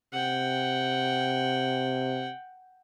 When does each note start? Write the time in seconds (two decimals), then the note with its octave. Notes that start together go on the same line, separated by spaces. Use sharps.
0.13 C3 F#5 G5